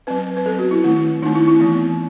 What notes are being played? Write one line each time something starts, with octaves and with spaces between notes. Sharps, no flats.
F#3 C4 B4
B4
F#3 B3 A4
F#4
E4
D#3 A3 C4 E4
D#3 A3 C4 D#4
E4
E4
E3 B3